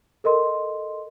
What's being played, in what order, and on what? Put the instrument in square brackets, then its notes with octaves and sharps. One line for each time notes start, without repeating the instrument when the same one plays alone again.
[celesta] A4 A#4 D#5 C6